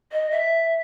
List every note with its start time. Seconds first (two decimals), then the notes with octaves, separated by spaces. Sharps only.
0.12 D#5
0.31 E5